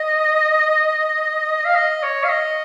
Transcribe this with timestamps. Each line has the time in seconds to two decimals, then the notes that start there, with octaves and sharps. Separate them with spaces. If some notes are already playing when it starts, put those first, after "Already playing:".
Already playing: D#5
1.65 F5
1.75 D#5
2.03 C#5
2.23 F5
2.29 D#5